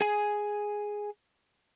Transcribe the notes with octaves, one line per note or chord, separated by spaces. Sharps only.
G#4 G#5